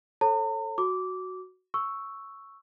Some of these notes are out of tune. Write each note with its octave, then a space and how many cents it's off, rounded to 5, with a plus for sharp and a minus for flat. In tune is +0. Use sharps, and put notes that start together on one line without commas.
A4 +0 C#5 -35 A#5 -45
F#4 +0 D6 -15
C#6 +0 E6 +0